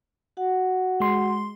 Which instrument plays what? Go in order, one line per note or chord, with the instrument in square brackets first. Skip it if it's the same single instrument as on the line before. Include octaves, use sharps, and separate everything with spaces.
[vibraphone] F#4 F#5
[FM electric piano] G#3 C6